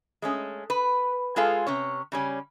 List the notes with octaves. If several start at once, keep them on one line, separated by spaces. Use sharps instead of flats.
G#3 A3 C#4
B4
G#3 F4 G#4 A4 F5
C3 C#4 C#5
C#3 G3 C#4